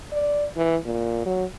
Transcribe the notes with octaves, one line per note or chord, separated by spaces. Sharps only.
D5
E3
A#2
F#3